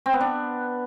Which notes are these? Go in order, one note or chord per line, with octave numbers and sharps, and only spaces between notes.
C4
B3
D4